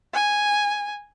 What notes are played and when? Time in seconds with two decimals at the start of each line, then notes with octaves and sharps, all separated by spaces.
0.14 G#5